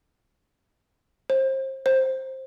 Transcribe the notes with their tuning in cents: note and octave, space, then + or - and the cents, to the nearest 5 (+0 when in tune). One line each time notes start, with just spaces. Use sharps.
C5 +30
C5 +10